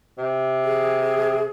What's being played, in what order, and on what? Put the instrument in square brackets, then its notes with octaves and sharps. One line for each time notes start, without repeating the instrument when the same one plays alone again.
[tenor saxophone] C3
[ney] G#4